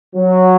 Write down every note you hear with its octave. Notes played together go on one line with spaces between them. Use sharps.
F#3